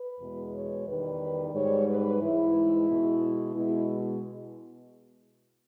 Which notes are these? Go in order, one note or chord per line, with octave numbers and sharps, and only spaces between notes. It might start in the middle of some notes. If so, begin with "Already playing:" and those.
Already playing: B4
E2 B2 G#3
C#5
E2 D#3 G3 B4
G#2 G3 C#5
B4
G#2 E3 G#3 E4
B2 G#3
B2 G#3 E4